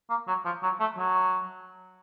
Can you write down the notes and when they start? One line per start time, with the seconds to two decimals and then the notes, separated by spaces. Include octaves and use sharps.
0.09 A#3
0.27 F#3
0.45 F3
0.63 F#3
0.80 A3
0.98 F#3